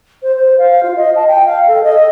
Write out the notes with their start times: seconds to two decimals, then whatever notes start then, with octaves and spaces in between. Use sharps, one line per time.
0.23 C5
0.36 C5
0.59 F5
0.83 F4
0.96 D#5
1.16 A5
1.28 G5
1.45 F5
1.68 A4
1.84 D#5